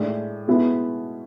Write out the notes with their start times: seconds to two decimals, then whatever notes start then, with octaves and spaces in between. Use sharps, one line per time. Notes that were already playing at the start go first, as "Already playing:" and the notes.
Already playing: A2 G#3 D4
0.48 B2 G#3 B3 E4